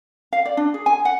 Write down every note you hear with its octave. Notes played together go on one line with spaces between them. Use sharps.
F5
D5
D4
G#4
G#5
F#5